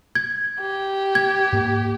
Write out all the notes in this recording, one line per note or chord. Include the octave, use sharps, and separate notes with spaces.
G#6
G4
G#6
G#2 A#3